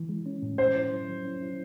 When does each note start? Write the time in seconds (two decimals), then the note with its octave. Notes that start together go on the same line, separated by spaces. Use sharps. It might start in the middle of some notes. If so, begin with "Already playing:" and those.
Already playing: E3
0.09 G#3
0.26 C#4
0.43 A2
0.58 C#4 C5
0.75 E4
0.92 F#3
1.09 F#3
1.25 C#4
1.42 E4